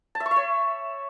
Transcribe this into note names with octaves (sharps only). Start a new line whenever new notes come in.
A5
E5
C#6
E5
C#5